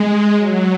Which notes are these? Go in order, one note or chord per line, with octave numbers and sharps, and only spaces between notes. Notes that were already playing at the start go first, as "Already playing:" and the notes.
Already playing: G#3
F#3